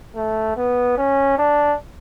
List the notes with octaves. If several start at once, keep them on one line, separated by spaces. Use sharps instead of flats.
A3
B3
C#4
D4